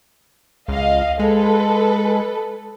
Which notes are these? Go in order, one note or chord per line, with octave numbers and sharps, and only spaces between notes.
C#2 D#5 F5
G#3 A4 B4